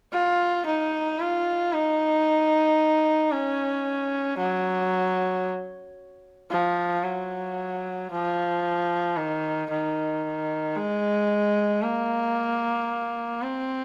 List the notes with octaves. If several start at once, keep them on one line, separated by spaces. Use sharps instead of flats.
F4
D#4
F4
D#4
C#4
F#3
F3
F#3
F3
D#3
D#3
G#3
A#3
C4